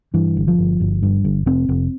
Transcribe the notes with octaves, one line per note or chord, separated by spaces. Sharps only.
G2 E3
G1
F3
G1
G1
G2
G1
F1 C4
F1